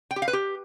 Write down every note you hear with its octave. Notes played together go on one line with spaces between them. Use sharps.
G5
G4
F5
B4
G4